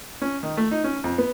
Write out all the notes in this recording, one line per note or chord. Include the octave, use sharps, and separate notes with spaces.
C#4
D#3
A3
D#4
C#4
F2
B3